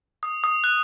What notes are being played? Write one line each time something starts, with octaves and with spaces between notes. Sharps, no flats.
D#6
D#6
F#6